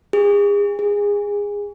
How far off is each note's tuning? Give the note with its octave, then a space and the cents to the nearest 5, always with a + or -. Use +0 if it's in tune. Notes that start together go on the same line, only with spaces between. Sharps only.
G#4 -35
G#4 -20